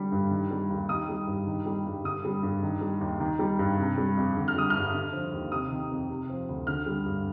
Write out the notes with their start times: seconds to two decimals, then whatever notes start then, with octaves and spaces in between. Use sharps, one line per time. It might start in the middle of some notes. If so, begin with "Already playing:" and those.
Already playing: D3 G3
0.12 G2
0.31 D#3
0.51 G3
0.70 D#2
0.89 D#3 D#6
1.09 G3
1.27 G2
1.47 D#3
1.66 G3
1.86 G2
2.04 D3 D#6
2.25 G3
2.43 G2
2.62 D#3
2.81 G3
3.01 D#2
3.20 D#3
3.39 G3
3.59 G2
3.78 C3
3.98 G3
4.17 F2
4.37 D3
4.48 F6
4.55 G3 D#6
4.70 G2 F6
4.94 D3
5.13 F3
5.32 D#2
5.52 C3 D#6
5.71 D#3
5.91 F2
6.10 C3
6.29 F3
6.49 D2
6.67 D3 F6
6.86 G3
7.06 G2